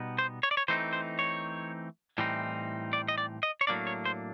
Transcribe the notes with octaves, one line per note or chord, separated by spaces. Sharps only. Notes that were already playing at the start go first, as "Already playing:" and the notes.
Already playing: B2 G3 B3 D#4
C5
C#5
D5
C#5
E3 A3 C4 D#4 C5
C5
C#5
A2 E3 G3 C4 D#4
D5
D#5
D5
D#5
C#5
A2 F#3 A#3 D4 D5
C#5
C5